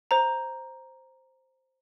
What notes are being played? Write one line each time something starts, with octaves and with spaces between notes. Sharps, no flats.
C5 A#5